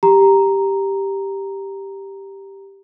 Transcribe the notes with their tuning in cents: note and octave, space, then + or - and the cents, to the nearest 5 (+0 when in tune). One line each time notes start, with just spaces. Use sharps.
G4 +0 A#5 +0